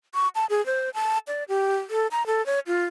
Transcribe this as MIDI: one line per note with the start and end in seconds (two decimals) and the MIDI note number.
0.14 0.28 85
0.35 0.46 81
0.50 0.64 68
0.66 0.90 72
0.94 1.18 81
1.28 1.44 74
1.49 1.76 67
1.90 2.07 69
2.11 2.26 82
2.27 2.44 69
2.46 2.60 73
2.67 2.85 65